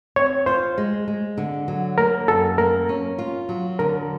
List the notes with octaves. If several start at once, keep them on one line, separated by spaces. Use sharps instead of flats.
C4 C#5
F4 C5
G#3
G#3
D3
F#3
A#3 A#4
F#2 A4
A#3 A#4
C#4
F4
F#3
D3 A#4